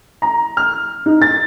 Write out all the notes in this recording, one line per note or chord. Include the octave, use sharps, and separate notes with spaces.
A#5
F6
D#4
A6